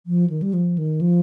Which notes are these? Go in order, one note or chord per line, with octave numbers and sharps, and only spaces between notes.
F3
D#3
G3
F3
D#3
F3